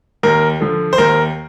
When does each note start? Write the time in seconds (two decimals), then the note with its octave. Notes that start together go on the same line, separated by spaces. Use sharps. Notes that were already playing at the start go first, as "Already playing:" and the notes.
0.23 D#2 A#4
0.60 D3 F3
0.93 C5
0.98 D#2 A#4